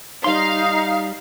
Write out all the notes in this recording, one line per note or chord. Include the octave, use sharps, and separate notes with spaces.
G3 D#4 F5 C6